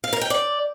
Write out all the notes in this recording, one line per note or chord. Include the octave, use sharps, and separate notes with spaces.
F5
A#4
G5
D5